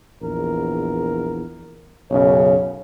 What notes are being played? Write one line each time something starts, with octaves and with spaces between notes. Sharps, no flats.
A#1 E2 A#4
B1 F#2 C#3 C#5